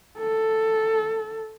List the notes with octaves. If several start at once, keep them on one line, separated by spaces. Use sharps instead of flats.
A4